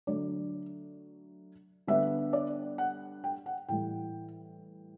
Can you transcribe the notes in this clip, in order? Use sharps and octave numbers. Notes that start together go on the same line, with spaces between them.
D3 F#3 A3 D4 D5
D3 G3 B3 D4 E5
D5
F#5
G5
F#5
A2 E3 G3 G5